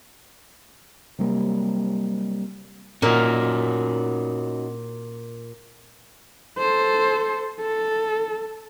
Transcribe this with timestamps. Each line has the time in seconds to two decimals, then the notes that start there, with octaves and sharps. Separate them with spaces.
1.19 C3 F#3 G3 A#3
3.02 A#2 C#4 D#4 F#4 A#4
6.58 A4 C5
7.60 A4